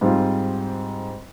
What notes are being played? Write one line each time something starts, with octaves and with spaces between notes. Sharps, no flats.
G#2 G3 C4 F4